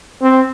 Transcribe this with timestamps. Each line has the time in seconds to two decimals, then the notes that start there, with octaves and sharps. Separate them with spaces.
0.22 C4